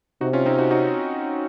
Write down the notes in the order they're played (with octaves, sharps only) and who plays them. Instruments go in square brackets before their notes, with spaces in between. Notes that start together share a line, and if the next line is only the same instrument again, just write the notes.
[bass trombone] C3 [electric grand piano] D#4 F#4
[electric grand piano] C#4 F4
C4 D#4
D#4 F#4
D#4 F#4